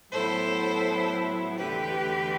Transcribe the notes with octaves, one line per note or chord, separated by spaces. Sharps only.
A2 F#3 B3 E4 A4 C5
E2 D3 A3 G4 B4